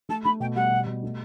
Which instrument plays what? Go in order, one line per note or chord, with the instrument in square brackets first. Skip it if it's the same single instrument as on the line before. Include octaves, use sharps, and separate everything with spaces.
[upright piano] A3 [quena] A5
[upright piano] A3 [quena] B5
[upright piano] B2 [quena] G5
[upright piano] G3 [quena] F#5
[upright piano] B2
B2
A3